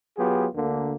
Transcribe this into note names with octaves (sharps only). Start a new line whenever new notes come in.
F#3 B3 F4 G4 G#4
D2 D3 A#3